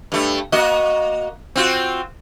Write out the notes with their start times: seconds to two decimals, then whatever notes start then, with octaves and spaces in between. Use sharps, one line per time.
0.12 G2 A3
0.52 A#3 F#4 D#5
1.56 C4 F4 F#4